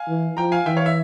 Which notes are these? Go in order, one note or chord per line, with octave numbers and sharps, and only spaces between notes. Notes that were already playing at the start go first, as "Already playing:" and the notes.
Already playing: F5 G#5
E3
F3 G5 A#5
F5 G#5
E3 E5 G5
C#5 F5
E5